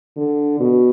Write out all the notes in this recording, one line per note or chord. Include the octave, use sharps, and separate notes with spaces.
D3
B2